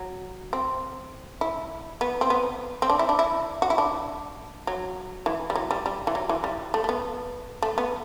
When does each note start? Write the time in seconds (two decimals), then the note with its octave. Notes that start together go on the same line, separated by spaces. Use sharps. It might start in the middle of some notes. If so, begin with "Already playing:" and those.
Already playing: F#3
0.53 C4
1.41 E4
2.01 B3
2.21 C4
2.30 B3
2.82 C4
2.90 D4
2.99 E4
3.09 D4
3.19 E4
3.62 F#4
3.70 E4
3.78 D4
4.67 F#3
5.26 E3
5.50 G3
5.55 F#3
5.71 G3
5.86 G3
6.07 E3
6.15 F#3
6.29 E3
6.44 G3
6.74 A3
6.84 A3
6.89 B3
7.62 A3
7.78 B3